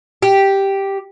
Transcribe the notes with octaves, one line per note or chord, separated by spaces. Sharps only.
G4